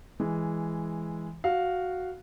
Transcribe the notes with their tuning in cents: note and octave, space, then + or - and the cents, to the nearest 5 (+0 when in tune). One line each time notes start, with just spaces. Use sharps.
E3 +0 G#3 +0
F#4 +0 F5 +0